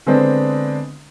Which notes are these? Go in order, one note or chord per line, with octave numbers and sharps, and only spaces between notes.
D3 G#3 B3 C4 D4